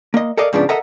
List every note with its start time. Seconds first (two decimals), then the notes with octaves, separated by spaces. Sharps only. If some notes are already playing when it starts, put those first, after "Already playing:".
0.14 A#3 D#5
0.37 A4 A#4 D5 D#5 F5
0.53 G#2 C#3 F3 B3 D4
0.69 A4 A#4 D#5 E5 F#5 A#5